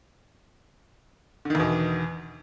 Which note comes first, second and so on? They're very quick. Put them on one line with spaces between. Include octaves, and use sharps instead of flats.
D3 D#3 E2 B2